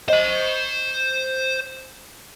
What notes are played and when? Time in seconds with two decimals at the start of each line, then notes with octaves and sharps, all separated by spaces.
0.08 C5 D#5 B5